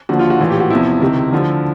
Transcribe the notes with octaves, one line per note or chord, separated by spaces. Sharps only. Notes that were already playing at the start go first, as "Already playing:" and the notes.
D#2 D3 F3 F#4
F4
F#4
A#1 A2 E3 F4
G4
F#4
E2 C3 F3 E4
C#2 C3 D#3
D2 D3 F3